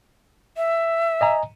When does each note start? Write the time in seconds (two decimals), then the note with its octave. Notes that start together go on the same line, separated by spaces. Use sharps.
0.57 E5
1.21 D#5 G#5 A#5